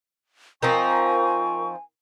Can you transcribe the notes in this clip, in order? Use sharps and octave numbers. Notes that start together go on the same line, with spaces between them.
F3 C4 D#4 A#4 G#5 A#5 C#6